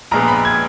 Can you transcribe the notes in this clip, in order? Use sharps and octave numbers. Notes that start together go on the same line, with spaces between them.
A#1 A#2 G#3 B3 A#5
B5
G#6